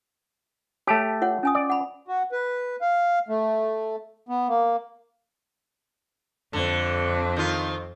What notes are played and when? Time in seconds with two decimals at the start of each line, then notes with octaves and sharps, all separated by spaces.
0.87 A3 G4 C#5 A5
1.22 F4 C#5 F#5
1.43 C#4 G#5 D#6
1.55 D5
1.70 F#5 B5
2.08 F#4
2.32 B4
2.81 F5
3.29 A3
4.29 B3
4.48 A#3
6.53 F2 D3 C4
7.37 D#3 F4